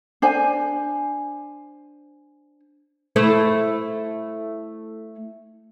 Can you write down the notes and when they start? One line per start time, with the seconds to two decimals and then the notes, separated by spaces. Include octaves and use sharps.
0.22 D4 C5 G#5
3.16 A3 E4 C5